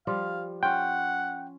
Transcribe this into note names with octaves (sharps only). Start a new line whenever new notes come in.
F3 G3 F4 F5
C#4 F4 F#5 G5